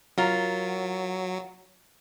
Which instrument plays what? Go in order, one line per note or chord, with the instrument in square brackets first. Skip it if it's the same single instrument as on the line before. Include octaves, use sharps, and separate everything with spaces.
[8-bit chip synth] F#3 [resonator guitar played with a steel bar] F4 A#4